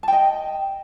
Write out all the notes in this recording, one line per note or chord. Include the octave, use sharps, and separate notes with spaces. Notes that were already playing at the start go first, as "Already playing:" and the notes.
D#5 G5 A5